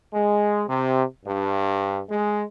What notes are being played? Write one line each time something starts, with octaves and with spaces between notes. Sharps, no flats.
G#3
C3
G2
G#3